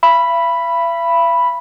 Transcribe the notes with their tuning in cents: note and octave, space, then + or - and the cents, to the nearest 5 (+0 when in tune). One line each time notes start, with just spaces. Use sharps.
E5 +45 B5 +0